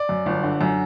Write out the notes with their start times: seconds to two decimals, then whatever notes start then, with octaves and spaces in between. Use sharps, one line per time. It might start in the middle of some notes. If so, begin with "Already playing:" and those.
Already playing: D5
0.09 F#2
0.26 G1
0.43 D3
0.61 F#2